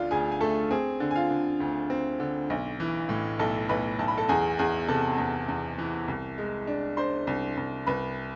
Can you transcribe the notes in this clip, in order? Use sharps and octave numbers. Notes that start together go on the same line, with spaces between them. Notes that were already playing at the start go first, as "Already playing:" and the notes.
Already playing: D2 D3 D4 F4 F5
D2 G#4 G#5
G#5
A3 A4 A5
C4 G#4 G#5
D3
G#5
F4 F5
D3
D2
C4
D3
B1
E3
A2
B1 A4 A5
B1 B4 B5
B1 A5
B5
A4 A5
E2 G#4 G#5
E2 G#4 G#5
C3 A4 A5
E2
E2
E3
C2
G#3
D4
D4 C5 C6
C2
C2
C2 B4 B5